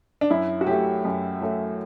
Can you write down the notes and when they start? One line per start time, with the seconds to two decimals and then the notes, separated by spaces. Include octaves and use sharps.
0.21 D4
0.30 F#2 E4
0.61 F#4
0.67 F#3 A3 G4
1.05 F#2
1.42 F#3 A3